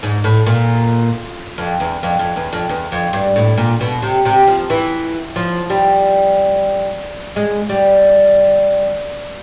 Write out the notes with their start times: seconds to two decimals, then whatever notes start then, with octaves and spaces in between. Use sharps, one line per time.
0.03 G#2
0.24 A2
0.46 A#2
1.58 F2
1.80 E2
2.03 F2
2.19 F2
2.36 E2
2.53 F2
2.69 E2
2.92 F2
3.13 G2
3.36 A2
3.58 A#2
3.81 B2
4.02 C3
4.25 C3
4.47 F3
4.70 E3
5.36 F3
5.70 G3
7.36 G#3
7.69 G3